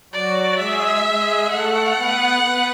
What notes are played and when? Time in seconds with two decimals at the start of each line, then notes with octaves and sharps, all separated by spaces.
0.13 F#3 F#4 D5
0.59 G#3 G#4 E5
1.05 G#3 G#4
1.51 A3 A4 F#5
1.97 B3 B4
2.43 B3 B4